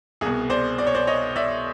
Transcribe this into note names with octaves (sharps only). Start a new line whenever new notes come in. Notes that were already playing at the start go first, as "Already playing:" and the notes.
C2 B2 G#4
C5 D5
D5
C#5
C5 D5
C#5 D#5
D5 E5